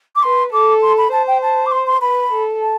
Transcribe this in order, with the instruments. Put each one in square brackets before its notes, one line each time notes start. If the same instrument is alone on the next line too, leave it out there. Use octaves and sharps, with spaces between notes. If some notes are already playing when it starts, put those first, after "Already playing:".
[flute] D6
[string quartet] B4 [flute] C6
[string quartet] A4 [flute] D6
[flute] C6
B5
[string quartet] C5 [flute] A5
[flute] G5
A5
D6
C6
C6
[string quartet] B4 [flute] B5
[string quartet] A4
[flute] A5